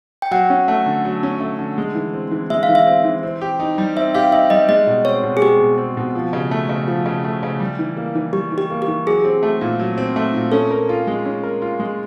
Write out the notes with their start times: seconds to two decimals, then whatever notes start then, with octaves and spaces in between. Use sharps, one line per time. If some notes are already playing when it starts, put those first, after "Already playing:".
0.22 G5
0.31 F#3 F#5
0.50 C#4
0.68 A3
0.86 D3
1.05 F#3
1.23 C#4
1.40 A3
1.59 D3
1.78 G#3
1.95 E3
2.14 C4
2.32 E3
2.50 G#3 E5
2.63 F5
2.69 E3
2.75 E5
2.87 C4
3.05 E3
3.23 C4
3.41 G4
3.59 D#4
3.78 G3
3.96 C4 E5
4.15 G4 F5
4.32 D#4 E5
4.50 G3 D#5
4.69 G#3 D#5
4.87 B2
5.05 C4 C#5
5.23 B2
5.37 G#4
5.42 G#3 G4
5.60 B2
5.78 C4
5.97 B2
6.15 F3
6.33 C#3
6.51 A3
6.69 C#3
6.88 F3
7.06 C#3
7.24 A3
7.43 C#3
7.60 G3
7.79 E3
7.97 A#3
8.15 E3
8.33 G3 G4
8.52 E3
8.58 G4
8.70 A#3
8.82 G4
8.88 E3
9.06 F#3 G#4
9.25 C4
9.43 A3
9.61 A#2
9.79 F#3
9.98 C4
10.16 A3
10.33 A#2
10.52 C#4 A4
10.71 A#4
10.89 F4
11.07 G#3
11.25 C#4
11.44 A#4
11.62 F4
11.80 G#3